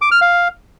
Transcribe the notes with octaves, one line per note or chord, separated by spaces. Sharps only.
D6
F6
F5